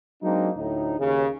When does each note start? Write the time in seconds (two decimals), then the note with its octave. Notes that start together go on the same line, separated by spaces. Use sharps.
0.22 F#3 G#3 A#3 C4 D4 D#4
0.57 D2 A2 D#4
1.00 D#2 C#3